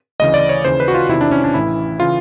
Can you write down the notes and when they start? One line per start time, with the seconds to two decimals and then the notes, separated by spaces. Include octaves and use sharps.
0.20 D2 C#3 E3 D#5
0.34 D5
0.49 C#5
0.65 D#2 C#3 E3 C5
0.80 B4
0.88 F#4
0.94 F4
1.09 E2 C3 D#3 E4
1.21 D4
1.31 C#4
1.44 D4
1.54 A1 A2 E3 E4
2.00 C#3 E3 F4